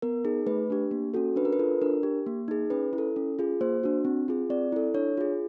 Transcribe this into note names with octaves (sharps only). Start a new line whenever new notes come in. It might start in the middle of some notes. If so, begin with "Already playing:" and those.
B3 A#4
D#4 G#4
A3 B4
D4 G4
A#3
C#4 F#4 A4
D4 B4
A#4
B4
F4 A4
D4 A#4
G4
A#3
D#4 G#4
C#4 B4
E4
A4
C#4
F4 G#4
A#3 C5
D4 F#4
C4
F4 G#4
C4 D5
E4 A4
D4 C#5
F4 G#4